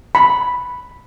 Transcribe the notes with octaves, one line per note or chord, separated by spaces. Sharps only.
B5